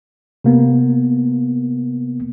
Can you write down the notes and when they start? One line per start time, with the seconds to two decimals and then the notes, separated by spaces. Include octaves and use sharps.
0.44 C3 A#3 B3